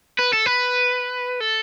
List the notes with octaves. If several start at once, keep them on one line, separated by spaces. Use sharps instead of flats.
B4
A4
B4
A4